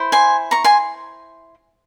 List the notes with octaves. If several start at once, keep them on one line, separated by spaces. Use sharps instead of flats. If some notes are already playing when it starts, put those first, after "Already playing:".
Already playing: E4 C5
G#5 C6
A#5 C#6
G#5 C6